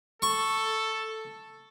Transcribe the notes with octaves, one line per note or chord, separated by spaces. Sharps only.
A4 C#6